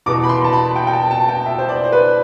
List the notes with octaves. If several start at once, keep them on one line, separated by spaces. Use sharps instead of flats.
E2 B2 D6
B5
C6
A5
B5
G5
G5
A5
A5
G5
E5
C5
D5
C5
B4